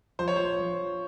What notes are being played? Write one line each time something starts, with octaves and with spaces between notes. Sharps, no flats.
F3 C5
C#5
C5
F3